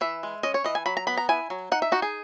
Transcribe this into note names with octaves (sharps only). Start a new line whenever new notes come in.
E3 E5
G#3
C#4 D#5
C#5
E3 D#5
G#5
F#3 B5
A#5
B3 B5
A#5
E4 G#5
F#3
D#4 F#5
E5
D#4 F#4
G#4